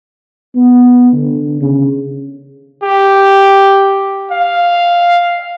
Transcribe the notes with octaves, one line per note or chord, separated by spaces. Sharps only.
B3
D3
C#3
G4
F5